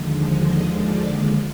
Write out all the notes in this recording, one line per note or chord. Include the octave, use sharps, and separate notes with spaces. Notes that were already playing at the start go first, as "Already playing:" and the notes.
Already playing: D#2 D3 F3 G#3
D#5
D5